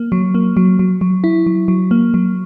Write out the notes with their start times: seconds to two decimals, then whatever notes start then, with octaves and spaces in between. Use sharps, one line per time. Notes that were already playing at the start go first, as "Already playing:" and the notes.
Already playing: A#3
0.12 F#3
0.34 A#3
0.57 F#3
0.79 F#3
1.01 F#3
1.24 E4
1.46 F#3
1.68 F#3
1.91 A#3
2.14 F#3